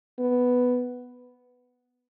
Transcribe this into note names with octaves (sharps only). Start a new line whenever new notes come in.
B3